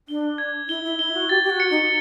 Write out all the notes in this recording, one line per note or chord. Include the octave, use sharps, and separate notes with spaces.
D4 G7
G#6
E4 G7
E4
E4 G7
F#4
G4 A6
G4
F#4
C#7
D#4